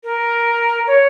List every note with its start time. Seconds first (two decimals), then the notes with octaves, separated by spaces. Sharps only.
0.03 A#4
0.87 C#5